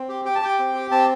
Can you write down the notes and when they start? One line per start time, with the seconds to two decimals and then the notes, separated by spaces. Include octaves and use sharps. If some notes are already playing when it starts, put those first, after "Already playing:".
Already playing: C4
0.09 G4
0.25 G4 G5
0.35 A5
0.42 G4 G5
0.59 C4
0.75 G4
0.91 C4 A5